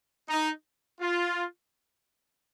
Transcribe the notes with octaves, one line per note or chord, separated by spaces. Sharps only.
D#4
F4